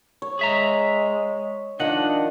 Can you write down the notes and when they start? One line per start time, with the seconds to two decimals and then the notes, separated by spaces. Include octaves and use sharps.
0.22 C#5
0.39 G#3 G#4 E5 A#5
1.80 D#3 F3 D4 D#4 D#5 F#5